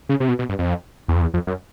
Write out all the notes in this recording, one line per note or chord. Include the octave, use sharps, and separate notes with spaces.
C#3
C3
B2
B2
G2
F2
E2
F2
E2
F2
F#2